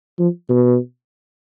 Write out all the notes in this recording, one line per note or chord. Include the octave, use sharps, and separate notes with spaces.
F3
B2